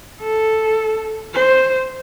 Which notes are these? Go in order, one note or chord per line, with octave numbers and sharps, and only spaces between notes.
A4
C5